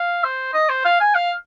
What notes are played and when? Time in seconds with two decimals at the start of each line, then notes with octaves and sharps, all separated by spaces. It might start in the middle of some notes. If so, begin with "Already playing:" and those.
Already playing: F5
0.24 C5
0.54 D#5
0.69 C5
0.85 F5
1.00 G#5
1.15 F5